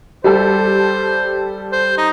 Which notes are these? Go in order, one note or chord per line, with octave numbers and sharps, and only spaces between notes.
G3 G4 A4 C5
C5
D#4